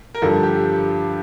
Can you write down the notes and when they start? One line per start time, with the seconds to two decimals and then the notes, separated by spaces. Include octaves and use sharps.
0.15 A#4
0.22 G2 D3 F3 A4
0.43 G4